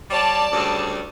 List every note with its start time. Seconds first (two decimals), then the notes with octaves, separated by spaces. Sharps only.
0.11 G3 C#5 D5 A5
0.53 D2 C#3 G3